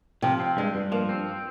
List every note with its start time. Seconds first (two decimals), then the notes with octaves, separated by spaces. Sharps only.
0.22 C3 F3
0.40 C4
0.57 G2 G#3
0.75 G2
0.92 F3 A#3
1.09 C4